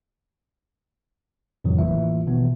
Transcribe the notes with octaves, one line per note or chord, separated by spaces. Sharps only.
F2 A2 C3 D#3 E3 F#3
A1 E3 G3 A#3 F4 E5
B2 D#3 E3 B3